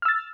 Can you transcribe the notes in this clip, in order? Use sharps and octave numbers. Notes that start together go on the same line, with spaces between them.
E6 F6 A6